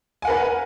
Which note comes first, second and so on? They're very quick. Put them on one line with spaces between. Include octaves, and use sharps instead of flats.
G#5 F#5 A#4 B4